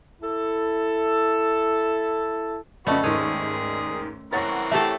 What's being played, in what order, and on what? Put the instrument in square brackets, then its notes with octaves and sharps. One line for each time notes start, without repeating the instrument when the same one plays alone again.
[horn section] E4 A4
[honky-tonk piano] F2 C#3 [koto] A3 [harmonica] F#4 B4 [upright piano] D5 D#5
[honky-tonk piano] D#2 G#2 D#3 [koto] C#4 [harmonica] G#4
[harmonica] E3 C4 A#4 [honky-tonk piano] C#5 F#5 C#6 [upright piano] A6 A#6
[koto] A3 A4 [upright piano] G4 E5